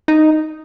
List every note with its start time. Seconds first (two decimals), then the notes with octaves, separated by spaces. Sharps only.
0.08 D#4